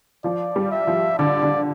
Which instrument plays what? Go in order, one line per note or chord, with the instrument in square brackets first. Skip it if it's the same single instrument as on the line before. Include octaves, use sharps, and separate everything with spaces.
[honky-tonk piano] F3 [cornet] D5
[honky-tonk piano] G3
[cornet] E5
[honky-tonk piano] F3
[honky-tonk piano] D3 [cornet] D5
[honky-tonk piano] D3